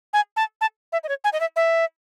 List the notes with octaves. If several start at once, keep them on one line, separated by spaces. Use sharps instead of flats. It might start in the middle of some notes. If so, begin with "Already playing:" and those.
G#5
A5
A5
E5
D#5
C#5
G#5
D#5
E5
E5